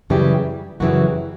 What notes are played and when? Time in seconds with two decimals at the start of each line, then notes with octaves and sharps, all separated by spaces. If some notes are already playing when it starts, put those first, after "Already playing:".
0.10 F#2 C#3 E3 G3 G4
0.80 F#2 C#3 E3 G3 F#4